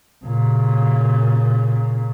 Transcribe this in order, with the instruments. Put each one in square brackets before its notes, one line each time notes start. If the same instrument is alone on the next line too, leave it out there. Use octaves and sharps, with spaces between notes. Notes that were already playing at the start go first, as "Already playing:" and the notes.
[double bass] A#2 C#3